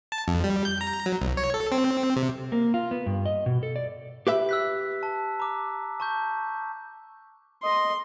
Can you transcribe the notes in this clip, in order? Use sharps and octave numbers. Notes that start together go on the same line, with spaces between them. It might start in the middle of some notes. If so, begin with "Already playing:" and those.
A5
F2
G3
G6
A#5
F#3
C2
C#5
A4
C4
C3
A#3
F4
B3
G2
D#5
B2
A4
D5
G4 B4 E5
E6 F#6 B6
A5
A#5 D6
A5 C#6 G6
D#5 C6